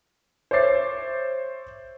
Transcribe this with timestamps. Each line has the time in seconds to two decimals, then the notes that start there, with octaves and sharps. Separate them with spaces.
0.51 C5 C#5 E5 D6 A6 C7